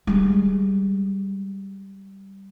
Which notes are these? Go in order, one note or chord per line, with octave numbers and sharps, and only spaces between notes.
G3 G#3